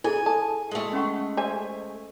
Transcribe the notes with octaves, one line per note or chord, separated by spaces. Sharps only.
E4 G#4 A4 G#5
A4 A5
G#3 A3
C#4 F#5 C#6
C5 E5 G#5